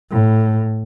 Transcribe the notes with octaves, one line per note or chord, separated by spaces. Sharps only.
A2